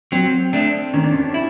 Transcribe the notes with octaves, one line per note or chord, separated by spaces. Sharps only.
F#3 C4
A3 D4
D#3 C#4
D4
C#4
E4